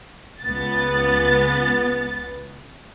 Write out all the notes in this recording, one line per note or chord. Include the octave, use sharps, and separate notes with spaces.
C#2 B3 A6